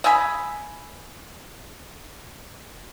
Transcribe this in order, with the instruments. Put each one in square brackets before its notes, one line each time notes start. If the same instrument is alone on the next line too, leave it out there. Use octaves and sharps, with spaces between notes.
[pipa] D#5 E5 G#5 B5